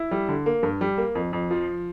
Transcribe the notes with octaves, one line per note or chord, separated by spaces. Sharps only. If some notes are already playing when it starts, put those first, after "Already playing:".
Already playing: E4
G3
D3
A#3
G2
G3
A#3
F2
F2
F3